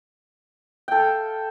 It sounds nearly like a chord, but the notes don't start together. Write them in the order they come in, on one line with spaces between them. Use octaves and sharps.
G5 A4 F5